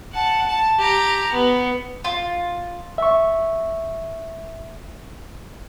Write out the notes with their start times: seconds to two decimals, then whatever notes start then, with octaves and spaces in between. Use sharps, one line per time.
0.13 F#5 A5
0.48 A5
0.79 G4 A#5
1.33 B3
2.04 F4
2.98 E5 C#6